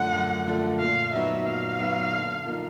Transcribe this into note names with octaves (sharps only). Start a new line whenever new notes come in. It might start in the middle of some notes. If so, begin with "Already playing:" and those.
Already playing: F#2 D3 F3 A3 F#5
F#2
D3 F3 A3
A#2 F5
F#3 B3 D#4 F#4 E5
A#2 F5
F#3 B3 D#4 F#4
D3
F3 A#3 D#4